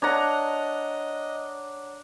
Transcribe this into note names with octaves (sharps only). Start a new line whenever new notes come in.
D4 C#5 D#5 F#5 A#5